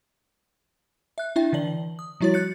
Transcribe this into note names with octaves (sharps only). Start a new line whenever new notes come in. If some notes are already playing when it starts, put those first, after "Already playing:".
E5 F#6
D4 E4 E5 G5
D3 E3 D5 F#7
D#6
F3 G3 E4 F#4 C#5 A6
F#6 G6 A6 C#7